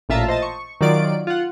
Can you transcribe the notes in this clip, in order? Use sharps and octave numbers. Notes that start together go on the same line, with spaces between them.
A1 A#2 F4 E5 A5 A#5
C5 D#5 A5
C#6
D#3 F#3 F4 D5 D7
F4 F#5